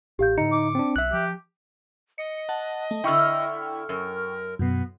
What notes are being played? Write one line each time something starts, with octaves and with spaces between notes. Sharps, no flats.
A1 G4 F5 G6
A2 D3 D#4 C#7
D6
C4 D4
B1 E5 F#6
F3 G4
D#5 C#7
F#5 A5
A3
D3 E4 G5 C#6 F6
F#2 A#4
F#2 B2 B3